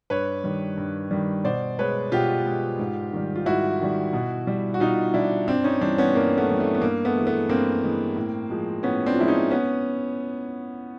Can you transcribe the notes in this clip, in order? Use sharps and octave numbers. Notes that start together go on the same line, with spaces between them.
G2 B4 C#5
D#3 G3
G2
D#3 G3
B2 C5 D5
G#3 B4 C#5
B2 F4 G4
G#3
G#2
D#3 G3
F4
G#2 E4 F#4
D#3 G3
B2
G3
F#4
B2 D#4 F4
G3 D4 E4
G2 C4 D4
C#4 D#4
E3 G3 C4 D4
B3 C#4
G2 A#3
A3 B3
E3 G3
A3
B3
G2 A#3
A3 B3
E3 G#3
A3 B3
G2 A#3 C4
E3 G#3
A2
F3 G#3
A2 B3 C#4
C4 D4
F4
F3 G#3 E4
C#4 D#4
B3 C#4